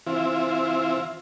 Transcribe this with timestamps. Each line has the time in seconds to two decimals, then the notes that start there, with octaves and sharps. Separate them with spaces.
0.07 E3 C4 E4 F4